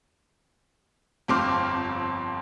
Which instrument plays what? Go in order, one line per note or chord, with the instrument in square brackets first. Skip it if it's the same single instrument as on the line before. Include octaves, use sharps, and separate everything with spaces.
[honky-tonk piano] G1 F2 C4 C6 D6 F6